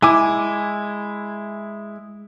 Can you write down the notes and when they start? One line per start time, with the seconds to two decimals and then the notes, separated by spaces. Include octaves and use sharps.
0.02 G#3 E4 G#5 D6